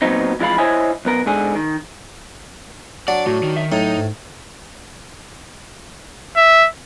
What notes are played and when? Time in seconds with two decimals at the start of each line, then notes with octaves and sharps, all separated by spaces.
0.02 A#2 F#3 B3 C4 D#4
0.40 F2 E3 G#3 F4 F5 B5
0.58 E4 C5 C#5 D#5 E5 G#5
1.05 B1 B3 A#4
1.26 G#2 D3 G#4
1.55 D#3
3.08 F#3 D4 D5 F#5
3.27 A2 F#4
3.43 D#3
3.57 E5
3.72 A2 F#3 D#4
3.98 G#2
6.37 E5